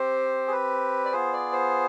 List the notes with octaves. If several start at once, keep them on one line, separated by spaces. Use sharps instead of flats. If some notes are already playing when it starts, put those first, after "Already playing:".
Already playing: C4 G4 C5
G#4
B4
D5
B3 F4 G#4 C5
D5
C5